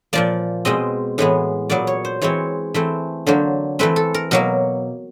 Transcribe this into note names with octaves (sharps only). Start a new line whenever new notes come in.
A#2 F3 A#3 D5
B2 G#3 C4 D#5
A2 E3 G#3 B3
A#2 F#3 B3 D5
C#5
C5
E3 G#3 C4 C#5
E3 A3 C4
D3 F#3 A#3 C5
E3 A3 C4 B4
A4
A#4
B2 F#3 A#3 A#4